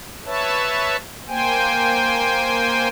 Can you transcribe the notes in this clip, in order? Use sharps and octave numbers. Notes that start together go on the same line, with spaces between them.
B4 C#5 E5 A5
A#3 C5 G5 G#5